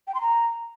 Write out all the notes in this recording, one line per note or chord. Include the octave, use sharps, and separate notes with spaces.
G5
C6
A#5